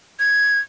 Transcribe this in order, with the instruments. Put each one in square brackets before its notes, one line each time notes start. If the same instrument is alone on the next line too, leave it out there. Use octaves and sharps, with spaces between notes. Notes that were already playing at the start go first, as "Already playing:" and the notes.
[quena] G#6